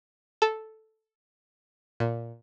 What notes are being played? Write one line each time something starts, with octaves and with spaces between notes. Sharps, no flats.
A4
A#2